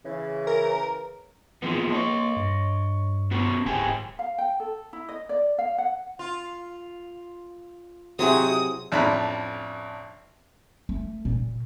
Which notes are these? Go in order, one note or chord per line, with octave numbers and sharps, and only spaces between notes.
C#3 E3
A#4
E3 F3 G#3 B3
A#3
C#5 D#5
G2
B3 C#4 F#4
D1 G#2 G4 G#5
F5
G5
A4
E4
D#5
D5
F5
F#5
F4
G#2 C3 F#3 C4 E4 F#4 G#4 D#6
A1 F2 D4 A#5 B5
A3
A#2